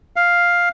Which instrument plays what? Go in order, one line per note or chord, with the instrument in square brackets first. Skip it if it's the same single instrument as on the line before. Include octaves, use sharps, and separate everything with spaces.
[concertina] F5